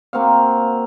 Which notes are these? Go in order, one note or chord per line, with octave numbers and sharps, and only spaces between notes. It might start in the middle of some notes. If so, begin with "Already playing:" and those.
A#3 C4 F#4 F5